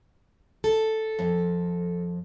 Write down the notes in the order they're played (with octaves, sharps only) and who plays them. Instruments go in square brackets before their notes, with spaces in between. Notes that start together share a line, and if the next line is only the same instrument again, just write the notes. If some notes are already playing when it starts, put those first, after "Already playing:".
[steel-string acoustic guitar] A4
[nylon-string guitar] F2